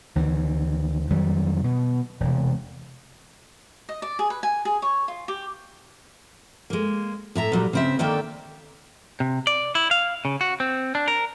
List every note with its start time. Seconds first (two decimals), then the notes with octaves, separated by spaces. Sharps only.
0.15 D2 D#3 E3
1.10 F2 D#3 F#3 G3
1.64 B2
2.20 E1 C3
3.89 D#5
4.02 D5
4.19 G#4
4.30 B4
4.43 G#5
4.65 G#4
4.82 C#5
5.08 F4
5.28 G4
6.70 G#3 A#3
7.35 A2 E5 A#5
7.52 A#2 F#3 G3
7.73 C#3 C4 E5
7.99 D3 D#3 A#3 D5 E5 G5
9.20 C3
9.47 D5
9.75 E4
9.91 F5
10.25 C#3
10.41 F#4
10.60 C4
10.95 D4
11.08 A#4